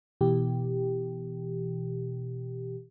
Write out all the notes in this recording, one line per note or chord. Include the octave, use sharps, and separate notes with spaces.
B2 E3 G4